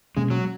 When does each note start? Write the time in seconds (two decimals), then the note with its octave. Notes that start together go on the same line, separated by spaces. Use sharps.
0.17 B2 G#3 A#3 C#4
0.30 F#3